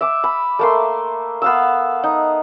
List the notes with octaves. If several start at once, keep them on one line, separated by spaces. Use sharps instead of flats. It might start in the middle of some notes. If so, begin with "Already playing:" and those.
E5 D6
B5
A3 A#3 C6
B3 F5 E6
D#4